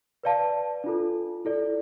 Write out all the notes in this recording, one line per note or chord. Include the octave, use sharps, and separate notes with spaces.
B4 D5 F5 A5
D4 F4 A4
E4 A4 D5